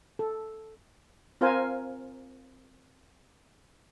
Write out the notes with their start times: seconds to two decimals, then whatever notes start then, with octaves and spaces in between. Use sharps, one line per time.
0.19 A4
1.41 C4 F4 A#4 C5 F5 G#5